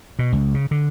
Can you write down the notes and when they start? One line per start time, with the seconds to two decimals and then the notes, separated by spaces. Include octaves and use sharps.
0.19 B2
0.32 C#2
0.54 C#3
0.71 D3